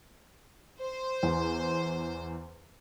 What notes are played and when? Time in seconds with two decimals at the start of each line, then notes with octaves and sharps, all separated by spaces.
0.80 C5
1.23 E2